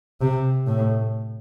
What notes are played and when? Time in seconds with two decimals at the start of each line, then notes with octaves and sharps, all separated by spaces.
0.21 C3
0.67 A2